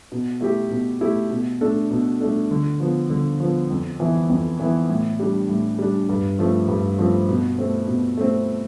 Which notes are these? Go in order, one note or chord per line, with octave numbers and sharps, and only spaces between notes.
B2
A3 E4 G4
B2
A3 E4 G4
B2
A3 D4 A4
B2
A3 D4 A4
D3
F3 B3
D3
F3 B3
F2
E3 B3 E4
F2
E3 B3 E4
A2
G3 D4
A2
G3 D4
G2
F3 A3 C4
G2
F3 A3 C4
B2
A3 C4
B2
A3 C4